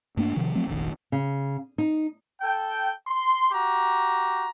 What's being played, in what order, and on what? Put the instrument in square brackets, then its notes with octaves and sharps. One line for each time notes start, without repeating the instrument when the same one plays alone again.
[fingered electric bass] G2 A3 A#3 D4
C3 D#3 F3
F3 F#3 A3 C4
F1 A#1 D#3
[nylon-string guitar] C#3
D#4
[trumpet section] A4 G5
C6
F#4 G4 A#5